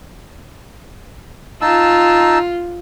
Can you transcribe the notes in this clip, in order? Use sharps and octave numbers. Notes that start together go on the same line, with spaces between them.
D#4 F4 A5 E6